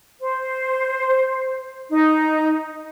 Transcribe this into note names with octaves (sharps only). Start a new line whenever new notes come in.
C5
D#4